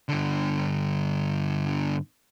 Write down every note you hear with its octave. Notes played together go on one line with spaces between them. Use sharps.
G2 D3